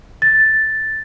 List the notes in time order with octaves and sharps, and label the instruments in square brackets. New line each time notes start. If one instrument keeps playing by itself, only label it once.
[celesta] A6